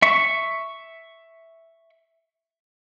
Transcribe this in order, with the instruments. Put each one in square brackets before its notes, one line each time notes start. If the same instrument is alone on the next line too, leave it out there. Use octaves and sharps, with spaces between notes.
[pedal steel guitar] E5 C#6